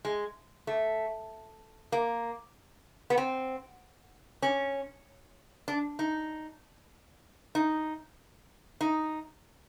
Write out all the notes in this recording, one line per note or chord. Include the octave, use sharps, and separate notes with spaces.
G#3
A3
A#3
B3
C4
C#4
D4
D#4
D#4
D#4